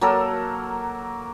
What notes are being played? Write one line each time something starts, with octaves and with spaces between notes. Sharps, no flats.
F#3 A#3 A4 A#4